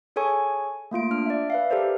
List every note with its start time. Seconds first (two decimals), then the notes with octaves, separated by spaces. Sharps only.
0.16 G#4 A4 C#5 G#5 C#6
0.91 A3 A#3 F4 D7
1.11 D4 F6 D7
1.26 D5 E5
1.50 B4 E5 F5
1.70 G4 A4 A#4 C5 D5